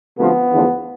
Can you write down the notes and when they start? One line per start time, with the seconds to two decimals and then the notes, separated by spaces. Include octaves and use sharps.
0.18 D2 C3 F3 A3 B3
0.51 E2 D3 F3 A3